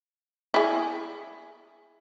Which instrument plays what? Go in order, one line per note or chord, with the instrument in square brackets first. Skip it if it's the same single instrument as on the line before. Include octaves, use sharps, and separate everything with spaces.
[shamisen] E4 G#4